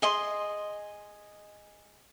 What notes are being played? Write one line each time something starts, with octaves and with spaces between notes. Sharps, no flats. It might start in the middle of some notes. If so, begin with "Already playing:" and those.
G#4 D#5 C6